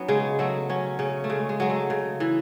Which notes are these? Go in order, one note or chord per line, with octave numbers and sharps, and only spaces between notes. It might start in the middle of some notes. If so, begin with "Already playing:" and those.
Already playing: F#3 B3 C#4 D#4
C#3 G#3
F#3 A3
F#3 C#4
C#3 C#4
A3
C#3 G#3
G#3
F#3 G#3
A3
C#3
E3